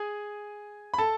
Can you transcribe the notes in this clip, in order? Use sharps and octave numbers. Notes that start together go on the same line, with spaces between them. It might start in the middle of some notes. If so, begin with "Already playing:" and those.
Already playing: G#4 G#5
B5
A4 A5